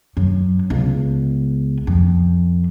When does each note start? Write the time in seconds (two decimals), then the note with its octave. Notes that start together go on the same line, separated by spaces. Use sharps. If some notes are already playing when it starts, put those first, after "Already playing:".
0.17 F#2
0.70 C#2 B3
1.87 F2